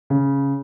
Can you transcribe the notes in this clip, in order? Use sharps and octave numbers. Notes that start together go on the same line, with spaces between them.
C#3